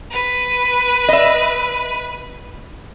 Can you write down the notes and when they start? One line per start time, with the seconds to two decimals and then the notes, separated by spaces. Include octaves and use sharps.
0.11 B4
1.09 D#5 E5